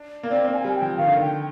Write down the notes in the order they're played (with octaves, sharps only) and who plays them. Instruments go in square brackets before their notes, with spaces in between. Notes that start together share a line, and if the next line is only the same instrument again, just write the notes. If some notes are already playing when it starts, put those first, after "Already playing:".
Already playing: [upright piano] D4
A#3
[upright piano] C4 [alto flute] D5
[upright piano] A#3
[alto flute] G#5
[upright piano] G3
[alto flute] G5
[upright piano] F3
[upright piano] D#3 [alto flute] F5
[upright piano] D3
D#3
[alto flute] G5